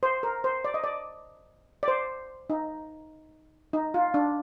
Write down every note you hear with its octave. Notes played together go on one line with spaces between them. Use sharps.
C5
A#4
C5
D5
D#5
D5
D5
C5
D#4
D#4
F4
D4